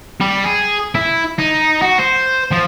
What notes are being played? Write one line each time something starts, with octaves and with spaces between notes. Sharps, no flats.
G3
G#4
E4
D#4
F#4
C5
F3